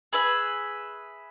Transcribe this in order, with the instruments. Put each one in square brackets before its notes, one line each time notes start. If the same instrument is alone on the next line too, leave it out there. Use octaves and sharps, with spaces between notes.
[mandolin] G#4 B4 E5